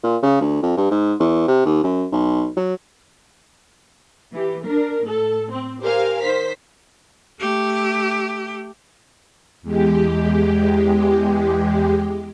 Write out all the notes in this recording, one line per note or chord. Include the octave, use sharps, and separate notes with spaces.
A#2
C#3
D2
F2
G2
G#2
E2
C3
D#2
F#2
B1
F#3
E3 G4
D4 A#4
A2 A4
C4
G4 A#4 C5 F5 G#5
D#3 C5 B6
A3 G4
E2 G#3 G4